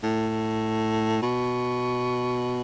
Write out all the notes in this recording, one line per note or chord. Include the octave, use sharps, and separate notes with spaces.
A2
B2